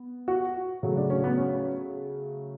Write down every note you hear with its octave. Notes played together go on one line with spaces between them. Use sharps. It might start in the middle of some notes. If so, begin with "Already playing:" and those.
Already playing: B3
F#4
C#3 F#3 A3
D4
C#4
B3
C#4